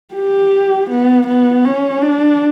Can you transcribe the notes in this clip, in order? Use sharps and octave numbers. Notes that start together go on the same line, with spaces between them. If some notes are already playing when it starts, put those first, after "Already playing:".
G4
B3
B3
C#4
D4